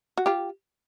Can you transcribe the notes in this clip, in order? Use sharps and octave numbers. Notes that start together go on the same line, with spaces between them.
F#4
F4 G4